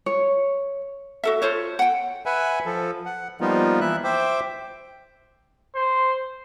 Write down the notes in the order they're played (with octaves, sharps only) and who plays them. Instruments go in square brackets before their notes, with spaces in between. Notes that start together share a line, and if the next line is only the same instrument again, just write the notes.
[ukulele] C#5
F#4 A4 E5
F4 A4 C5 C#5
F#5 G5
[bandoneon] B4 E5 F#5 G#5 B5
F3 A4
F#5
F3 G3 A#3 B3 D#4 F4
E3 E4 E5 F#6
C5 E5 G5 D6
[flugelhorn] C5